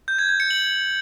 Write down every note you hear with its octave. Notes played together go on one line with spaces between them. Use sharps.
G6
G#6
G#6
C#7
F#7